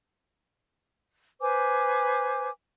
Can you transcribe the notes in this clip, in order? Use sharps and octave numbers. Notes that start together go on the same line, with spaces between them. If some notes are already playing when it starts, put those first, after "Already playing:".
B4 C5 G#5 D6